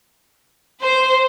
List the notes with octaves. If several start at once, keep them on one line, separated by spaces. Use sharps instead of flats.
C5